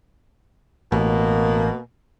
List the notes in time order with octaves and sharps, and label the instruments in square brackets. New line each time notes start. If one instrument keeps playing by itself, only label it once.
[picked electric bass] A1 [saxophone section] B2 A#3